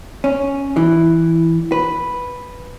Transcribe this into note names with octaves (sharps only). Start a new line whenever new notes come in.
C#4
E3
B4